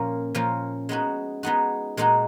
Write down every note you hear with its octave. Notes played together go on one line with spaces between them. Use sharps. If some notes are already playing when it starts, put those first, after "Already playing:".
Already playing: A#2 F3 A#3 C#4 F4
A#2 F3 A#3 C#4 F4
G#3 B3 D#4 F#4
G#3 B3 D#4 F#4
A#2 G#3 D#4 F#4